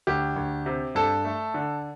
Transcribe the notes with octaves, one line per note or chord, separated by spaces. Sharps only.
D2 G4
D2
C3
G2 A4
A3
D3